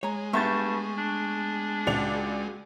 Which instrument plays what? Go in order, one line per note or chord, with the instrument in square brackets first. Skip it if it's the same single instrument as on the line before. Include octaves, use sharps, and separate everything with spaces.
[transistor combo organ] G#3 [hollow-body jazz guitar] C#5 A#5
[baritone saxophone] G2 [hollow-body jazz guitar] A3 B3 [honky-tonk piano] C#6 G6 A6
[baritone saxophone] D4
[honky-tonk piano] C#2 D5 F7 [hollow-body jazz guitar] F#4